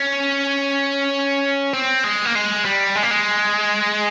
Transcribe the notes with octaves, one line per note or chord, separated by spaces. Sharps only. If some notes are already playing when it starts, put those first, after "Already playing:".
Already playing: C#4
C4
G#3
A#3
G#3
G3
G#3
A#3
G#3